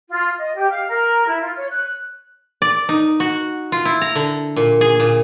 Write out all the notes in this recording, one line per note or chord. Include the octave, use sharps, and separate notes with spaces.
F4
D#5
G4
F5
A#4
E4
F4
C#5
F#6
D5
D#4
F#4
F4
E4
A#5
D3
A#2
G#4
A#2